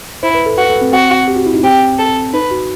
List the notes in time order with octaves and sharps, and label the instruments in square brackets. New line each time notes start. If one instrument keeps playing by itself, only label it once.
[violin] E4 [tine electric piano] C5
[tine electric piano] B4
A4
[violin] F#4 [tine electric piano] B4
[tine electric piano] A4
C4
[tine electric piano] C4 [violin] F#4
[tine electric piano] G4
F#4
E4
D#4
[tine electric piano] C4 [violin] G4
[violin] A4
[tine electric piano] D#4 [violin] B4
[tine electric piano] F#4